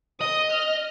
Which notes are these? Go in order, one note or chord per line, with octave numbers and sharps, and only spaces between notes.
D#5 D#6
F6